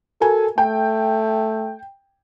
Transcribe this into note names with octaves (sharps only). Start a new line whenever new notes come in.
F#4 A4 A#4 G#5
A3 G5